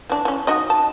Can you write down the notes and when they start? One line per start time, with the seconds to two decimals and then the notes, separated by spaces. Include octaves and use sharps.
0.10 E3 D4
0.25 E3 C#4
0.47 D#4 F#4 D#5
0.70 A5